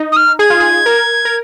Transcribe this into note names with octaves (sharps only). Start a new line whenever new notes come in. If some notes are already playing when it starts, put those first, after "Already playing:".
Already playing: D#4
D#6
F6
G#4 G#6
F4
G#4
A#4
A#4